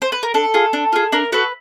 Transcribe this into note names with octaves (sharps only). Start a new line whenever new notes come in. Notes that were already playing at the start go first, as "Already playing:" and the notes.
C5
B4
A#4
D4 A4
F4 G#4
D4
F4 G#4
D4 A#4
F#4 A4 B4